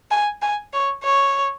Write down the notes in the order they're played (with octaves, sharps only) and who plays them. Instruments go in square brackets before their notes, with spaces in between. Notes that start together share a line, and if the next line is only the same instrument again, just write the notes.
[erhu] G#5
G#5
C#5
C#5